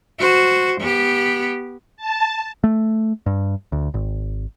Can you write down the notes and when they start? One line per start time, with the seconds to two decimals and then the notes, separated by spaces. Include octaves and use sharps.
0.19 F#4 C5
0.80 B3 G4
1.97 A5
2.64 A3
3.26 G2
3.72 D2
3.94 G#1